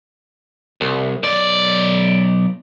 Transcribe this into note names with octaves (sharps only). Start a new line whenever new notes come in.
C2
B1 D5